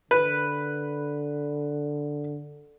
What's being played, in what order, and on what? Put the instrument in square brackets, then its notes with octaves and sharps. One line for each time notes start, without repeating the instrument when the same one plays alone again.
[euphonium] D3 [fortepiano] B4